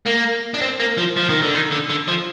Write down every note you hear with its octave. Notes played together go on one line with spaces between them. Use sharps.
A#3
D4
C4
A#3
F3
F3
D#3
D3
D#3
D3
D3
F3